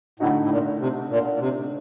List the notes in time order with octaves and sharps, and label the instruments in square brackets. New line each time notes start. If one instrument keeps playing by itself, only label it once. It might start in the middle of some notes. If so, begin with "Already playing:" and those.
[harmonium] A2 [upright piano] D3 A3 D#4 F#4
[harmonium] A2
A#2
C3
A#2
A#2
C3